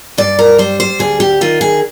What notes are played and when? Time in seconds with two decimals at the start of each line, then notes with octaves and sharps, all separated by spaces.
0.18 G2 D5
0.39 A#4
0.58 G3 C5
0.80 C5
0.99 D2 G#4
1.20 G4
1.41 D#3 F4
1.61 G#4